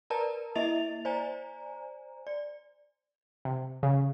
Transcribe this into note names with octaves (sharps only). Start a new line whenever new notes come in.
A#4 B4 D5 A5 A#5
A#3 E4 D#5 E5 A6 F7
C5 D5 G#5 A#5
D5
C3
C#3